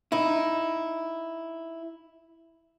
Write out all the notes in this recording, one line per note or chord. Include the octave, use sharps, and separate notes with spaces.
D#4 E4